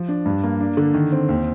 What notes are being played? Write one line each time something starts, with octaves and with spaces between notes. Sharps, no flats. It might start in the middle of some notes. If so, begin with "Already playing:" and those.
Already playing: F3
D4
G2
A#3
D4
D3
D#3
C4
D#2